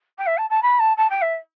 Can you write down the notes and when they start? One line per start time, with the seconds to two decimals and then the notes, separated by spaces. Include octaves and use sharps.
0.18 G5
0.26 E5
0.37 A5
0.50 A5
0.62 B5
0.79 A5
0.97 A5
1.10 G5
1.21 E5